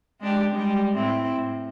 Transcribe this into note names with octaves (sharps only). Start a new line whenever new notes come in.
G#3 D4 G4
G3 G#3
A2 C4 E4
A2